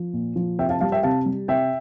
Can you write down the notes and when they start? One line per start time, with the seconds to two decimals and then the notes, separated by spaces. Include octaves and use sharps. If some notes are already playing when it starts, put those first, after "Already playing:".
Already playing: F3
0.13 A#2
0.36 F3
0.58 C3 E5 G5
0.69 F5 A5
0.80 G3 F5 A5
0.92 E5 G5
1.03 C3 F5 A5
1.26 G3
1.48 C3 E5 G5